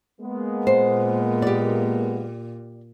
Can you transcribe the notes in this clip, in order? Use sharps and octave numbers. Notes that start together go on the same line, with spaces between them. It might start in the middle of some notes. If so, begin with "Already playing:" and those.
G#3 A#3 B3
A#2 C5
G4 D5